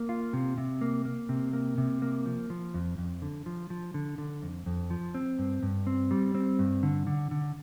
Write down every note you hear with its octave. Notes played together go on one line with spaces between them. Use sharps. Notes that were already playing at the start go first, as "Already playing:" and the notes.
Already playing: A#3
F4
C3
C3
A#3
A#3
C3
A#3
C3
A#3
F3
F3
F2
F2
D3
F3
F3
D3
D3
F2
F2
F3
C4
G2
G2
C4
G3
C4
G2
D3
D3
D3